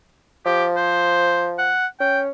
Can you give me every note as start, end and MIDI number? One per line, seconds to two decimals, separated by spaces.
0.46 1.72 53
0.46 0.66 67
0.77 1.47 72
1.58 1.86 78
2.00 2.30 61
2.00 2.20 79